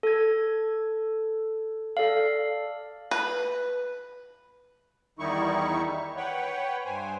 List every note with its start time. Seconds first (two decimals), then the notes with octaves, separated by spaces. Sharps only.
0.03 A4 G#6
1.97 A4 D5 F5
3.11 B4
5.19 E2 D#3 G3 D#4 E4 C#6
6.17 B4 C#5 F#5 G5
6.85 G2 C5 G#5